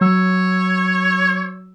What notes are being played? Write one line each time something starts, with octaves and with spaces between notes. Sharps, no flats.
F#3 C#5 E6